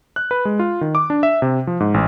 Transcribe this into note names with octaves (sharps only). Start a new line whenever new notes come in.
F#6
B4
G#3
F4
D#3
D6
D4
E5
C3
F3
G#2
A1